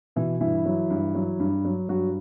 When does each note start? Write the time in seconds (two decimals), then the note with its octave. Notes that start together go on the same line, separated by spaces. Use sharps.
0.16 B2 E3 E4
0.41 G2 E3 E4
0.66 F#3
0.90 G2
1.15 F#3
1.40 G2
1.65 F#3
1.89 G2 F#3 F#4